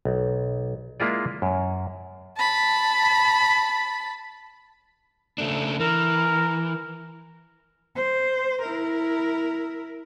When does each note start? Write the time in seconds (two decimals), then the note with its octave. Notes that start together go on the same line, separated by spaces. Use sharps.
0.05 B1
1.00 G#3 A#3 E4 F4 G#4 D5
1.42 F#2
2.37 A5 B5
5.38 C#3 A3 D4
5.80 E3 A#4
7.96 C5
8.62 E4 A#4